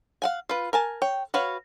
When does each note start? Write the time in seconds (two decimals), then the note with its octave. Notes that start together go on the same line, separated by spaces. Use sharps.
0.22 F5 F#5 G#5
0.49 F4 B4
0.73 A#4 G#5 A5
1.02 C#5 G5
1.34 F#4 B4 C#5 F5